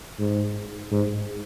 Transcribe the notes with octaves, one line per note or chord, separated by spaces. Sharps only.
G#2
G#2